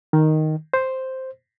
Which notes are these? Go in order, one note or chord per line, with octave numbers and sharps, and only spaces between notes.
D#3
C5